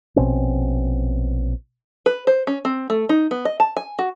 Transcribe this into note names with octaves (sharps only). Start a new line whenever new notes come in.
A#1 B2 C4 C#4
B4
C5
C#4
C4
A3
D#4
B3
D#5
A5
G#5
F#4